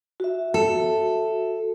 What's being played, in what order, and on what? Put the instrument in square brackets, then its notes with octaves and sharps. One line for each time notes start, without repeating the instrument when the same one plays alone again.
[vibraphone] F#4 E5
[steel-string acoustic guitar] A4